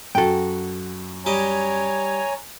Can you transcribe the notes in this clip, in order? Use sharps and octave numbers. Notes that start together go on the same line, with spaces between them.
F#2 F#4 A4 G5
G3 G4 C#5 D#5 G#5 A#5